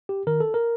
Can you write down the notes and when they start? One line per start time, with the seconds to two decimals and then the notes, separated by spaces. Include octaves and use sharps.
0.09 G4
0.27 D#3 A#4
0.40 A4
0.54 A#4